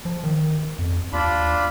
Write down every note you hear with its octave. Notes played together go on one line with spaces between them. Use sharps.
F3
D#3
F2
D#2 D4 F4 B5